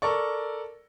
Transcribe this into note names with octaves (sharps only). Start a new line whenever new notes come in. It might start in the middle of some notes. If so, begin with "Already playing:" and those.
A4 A#4 D5 C#6